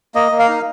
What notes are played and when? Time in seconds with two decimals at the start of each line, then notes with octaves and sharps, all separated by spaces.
0.15 A#3 D#5
0.32 A#3
0.39 F5
0.49 D#4